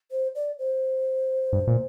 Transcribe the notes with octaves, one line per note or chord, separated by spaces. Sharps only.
C5
D5
C5
G2
A#2